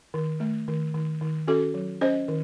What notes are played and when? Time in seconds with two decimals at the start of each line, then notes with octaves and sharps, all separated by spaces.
0.14 D#3
0.40 A3
0.68 D#3
0.94 D#3
1.21 D#3
1.48 C#4 F#4 A4
1.74 F#3
2.01 C#4 C5 D#5
2.28 D#3